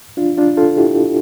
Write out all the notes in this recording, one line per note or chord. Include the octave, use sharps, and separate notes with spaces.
D4 F4
D4 F4
F4 A4
E4 G4